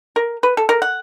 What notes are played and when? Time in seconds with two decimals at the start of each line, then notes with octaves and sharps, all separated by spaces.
0.16 A#4
0.43 B4
0.57 A4
0.69 A#4
0.82 F#5